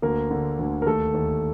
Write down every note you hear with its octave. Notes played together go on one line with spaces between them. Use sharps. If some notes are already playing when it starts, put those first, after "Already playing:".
D2 A#3 A#4
D3
D2
A#4
D#2 A3 A4
D#2